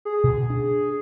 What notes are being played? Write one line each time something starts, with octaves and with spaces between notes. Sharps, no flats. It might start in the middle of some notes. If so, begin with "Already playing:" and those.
G#4
B2
D4